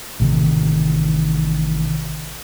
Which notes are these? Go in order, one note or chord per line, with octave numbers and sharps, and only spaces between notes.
A1 C3 D#3